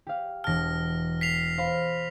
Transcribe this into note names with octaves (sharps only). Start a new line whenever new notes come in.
G4 F5
E1 A5 F6 A#6
B6 C7 F7
C5 F5 B5